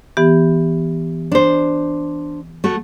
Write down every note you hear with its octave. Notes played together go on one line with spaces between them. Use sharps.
E3 B3 G4
D4 C5
A3 F#4